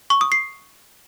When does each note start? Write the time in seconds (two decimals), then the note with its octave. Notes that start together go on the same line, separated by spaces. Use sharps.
0.10 C#6
0.21 D#6
0.32 C7